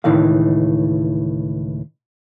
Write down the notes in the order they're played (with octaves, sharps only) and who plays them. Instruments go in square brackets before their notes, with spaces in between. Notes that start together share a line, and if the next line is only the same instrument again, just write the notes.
[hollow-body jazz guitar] C#2 A2 D#3 E3 F5